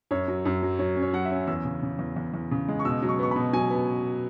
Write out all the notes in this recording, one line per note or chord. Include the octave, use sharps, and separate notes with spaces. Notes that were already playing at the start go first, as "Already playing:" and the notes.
F#2 C#5
F#3
F#2
F#3
F#3 C#5
C#4
C#5
F#3 F#5
E5
C#4
E2 E6
C#3
C#3
E2
E2
E2
C#3
G#3
C#6
B2 E6
F#3
C#6
B3 C#6
B2 B5
F#3 G#5
B3